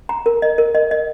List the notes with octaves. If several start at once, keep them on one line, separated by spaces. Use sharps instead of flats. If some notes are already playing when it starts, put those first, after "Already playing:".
A#5
A#4
D#5
A#4
D#5
D#5